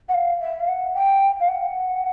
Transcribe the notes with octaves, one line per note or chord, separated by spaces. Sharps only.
F#5
F5
E5
F5
F#5
G5
F5
F#5